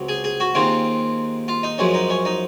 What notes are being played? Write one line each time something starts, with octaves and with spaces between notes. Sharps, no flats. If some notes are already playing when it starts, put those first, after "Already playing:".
Already playing: C#2 C3 F#3
G#4
G#4
F#4
D#2 D#3 G#3 C4 F4
F4
D#4
F#2 F3 G#3 C#4
D#4
C#4
D#4